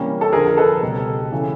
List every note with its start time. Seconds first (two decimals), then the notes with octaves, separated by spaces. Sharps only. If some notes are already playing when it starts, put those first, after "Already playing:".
Already playing: C3 E3 G3 A#3 C#4
0.21 A4
0.32 F2 D3 F3 G#4 A#4
0.48 A#4
0.57 A4 B4
0.82 C#2 B2 G3
1.32 C#3 E3 A3 C#4